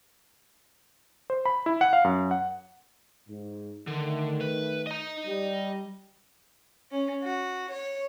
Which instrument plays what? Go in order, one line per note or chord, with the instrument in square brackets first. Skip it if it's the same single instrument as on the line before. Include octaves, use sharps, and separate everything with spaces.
[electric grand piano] C5
B5
E4
F#5
F5
F#2
F#5
[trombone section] G#2
[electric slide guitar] D3 [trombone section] D#3 A3
[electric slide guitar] B4
D#5 A#5
[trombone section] G3
[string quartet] C#4
F#4
C#5